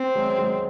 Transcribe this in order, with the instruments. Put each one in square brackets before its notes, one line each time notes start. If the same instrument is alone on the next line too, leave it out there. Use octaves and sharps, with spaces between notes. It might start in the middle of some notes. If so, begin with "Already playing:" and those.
Already playing: [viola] C4
[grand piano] F#3 G#3
F#3 G#3